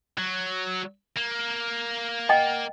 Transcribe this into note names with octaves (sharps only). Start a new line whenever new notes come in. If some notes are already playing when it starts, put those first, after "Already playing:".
F#3
A#3
D#5 F#5 G5